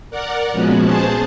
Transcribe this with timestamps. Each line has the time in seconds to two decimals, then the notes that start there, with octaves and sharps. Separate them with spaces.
0.11 A#4 D5 F#5
0.53 A#2 F3 G#3 B3 C#4 F#4
0.84 G#4 C5 A5